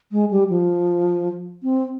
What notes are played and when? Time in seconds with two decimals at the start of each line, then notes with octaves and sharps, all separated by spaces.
0.12 G#3
0.31 G3
0.49 F3
1.63 C4